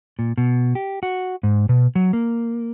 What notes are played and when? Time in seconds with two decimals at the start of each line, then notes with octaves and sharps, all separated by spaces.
0.19 A#2
0.38 B2
0.75 G4
1.03 F#4
1.43 G#2
1.69 B2
1.95 F#3
2.13 A#3